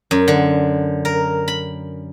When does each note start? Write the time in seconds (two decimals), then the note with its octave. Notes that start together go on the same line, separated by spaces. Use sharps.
0.11 F#2
0.28 D3
1.05 A#4
1.48 B5